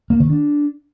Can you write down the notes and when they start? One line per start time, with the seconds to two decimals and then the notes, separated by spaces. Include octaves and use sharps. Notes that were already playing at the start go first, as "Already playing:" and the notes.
0.10 A#3
0.20 D#3
0.30 D4